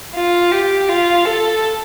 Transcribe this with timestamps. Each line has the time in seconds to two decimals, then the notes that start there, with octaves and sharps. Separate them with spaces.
0.15 F4
0.51 G4
0.88 F4
1.25 A4